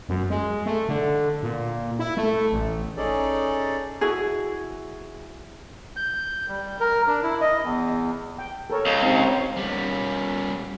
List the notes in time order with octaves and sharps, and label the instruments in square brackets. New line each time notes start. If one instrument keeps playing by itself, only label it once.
[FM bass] F#2
G#3
A3
D3
A#2
E4
A3
A1
[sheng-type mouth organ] C#4 D#4 G#4 A4 D5
[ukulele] E4 F#4 G#4
[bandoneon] G6
G3
A#4
D4
E4
D#5
E2
[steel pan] G5
A4 A#4 C#5
[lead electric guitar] C#2
[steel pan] C4 D#4 G4
C5 C#5
[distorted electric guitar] G3 C#4